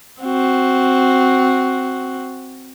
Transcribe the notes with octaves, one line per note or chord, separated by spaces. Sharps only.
C4 F#4